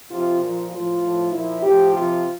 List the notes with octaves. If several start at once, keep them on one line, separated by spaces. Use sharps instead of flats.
C3 F3 F4
A#2 F3 F4
A2 F3 F4
A2 F3
A#2 F3 E4
A2 F3 G4
C3 F3 F4